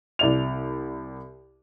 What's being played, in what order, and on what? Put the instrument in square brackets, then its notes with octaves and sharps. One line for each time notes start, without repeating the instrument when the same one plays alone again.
[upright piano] C2 D5 F7